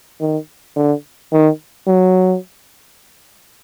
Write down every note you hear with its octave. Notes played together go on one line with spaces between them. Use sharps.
D#3
D3
D#3
F#3